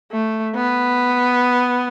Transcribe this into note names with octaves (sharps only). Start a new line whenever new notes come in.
A3
B3